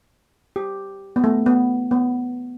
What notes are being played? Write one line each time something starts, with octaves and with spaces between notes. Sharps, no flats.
G4
B3
A3
B3
B3